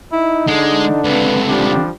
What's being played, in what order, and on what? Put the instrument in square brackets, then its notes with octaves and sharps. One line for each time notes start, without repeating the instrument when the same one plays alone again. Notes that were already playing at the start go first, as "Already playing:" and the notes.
[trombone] D#4 [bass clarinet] E4
[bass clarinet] D3 [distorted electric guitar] G#3 [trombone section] D4
[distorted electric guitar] C#2 C3 [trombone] B4
[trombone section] F3 G3 D4 [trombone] G4